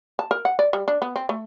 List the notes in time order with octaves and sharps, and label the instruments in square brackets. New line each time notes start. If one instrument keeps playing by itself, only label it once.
[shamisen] A5
A#4
F#5
D5
G3
D4
B3
C4
A3